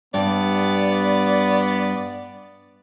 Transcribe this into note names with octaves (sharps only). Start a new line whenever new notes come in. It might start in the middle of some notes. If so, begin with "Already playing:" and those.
G2 G3 B3 D5